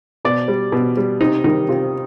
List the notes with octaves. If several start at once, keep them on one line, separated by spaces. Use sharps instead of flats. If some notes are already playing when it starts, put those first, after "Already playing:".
B2 D5
G3
B2
G3
C3 D#4
D#3 G3 D#4
C3 F4